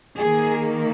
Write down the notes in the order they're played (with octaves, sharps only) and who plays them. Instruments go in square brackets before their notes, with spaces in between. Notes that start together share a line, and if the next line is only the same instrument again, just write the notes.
[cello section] D#3 A#3 G#4